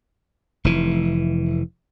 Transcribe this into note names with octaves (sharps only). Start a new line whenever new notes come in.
F1 E3